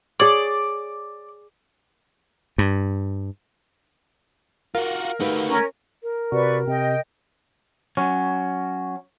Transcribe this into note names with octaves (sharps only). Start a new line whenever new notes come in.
G#4 C#5 D5
G2
F4 F#4 A#4 F5
A3 D#4 F#4 G4 B4
C#4 A#4
A#4
C3 F#4 B4 D5 C#6
C3 D#5 G5
F#3 C#4